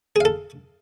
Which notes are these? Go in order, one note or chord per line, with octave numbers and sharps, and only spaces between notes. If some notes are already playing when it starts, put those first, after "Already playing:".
G#4 A4 F5